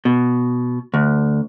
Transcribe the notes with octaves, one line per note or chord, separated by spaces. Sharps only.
B2
D2